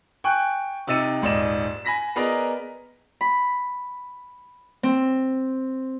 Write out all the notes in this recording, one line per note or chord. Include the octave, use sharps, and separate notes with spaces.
G5 G#5 C#6 F#6
C3 D#4 E6 A6 C#7 D#7
D#1 G#2 D5 D#5 E7
G#5 B5 A#6 B6
B3 G#4 A#4 D5 D#5 A#5
B5
C4